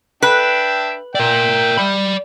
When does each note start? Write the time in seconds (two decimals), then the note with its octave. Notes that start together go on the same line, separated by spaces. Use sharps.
0.22 D4 B4 E5 G5
1.15 A#4 D5 E5 G5
1.78 D5 B5